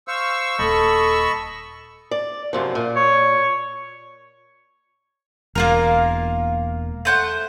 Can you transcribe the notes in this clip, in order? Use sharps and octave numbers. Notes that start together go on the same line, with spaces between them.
C5 F5 C#6 E6
D#1 A4 D#5 A5 B5
D5
F#2 C3 F3
A#2
C#5
E1 A#3 F4 A#4
A3 C5 F#5